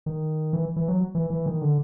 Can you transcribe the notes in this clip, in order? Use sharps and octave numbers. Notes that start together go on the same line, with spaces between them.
D#3
E3
E3
F#3
E3
E3
D#3
D3